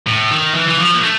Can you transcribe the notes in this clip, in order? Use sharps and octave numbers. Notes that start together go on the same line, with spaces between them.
A2
D#3
E3
E3
F3
A#3
A3